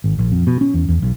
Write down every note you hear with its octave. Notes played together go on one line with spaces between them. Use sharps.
G#1
A#1
F2
B2
C#4
E2
E2
B1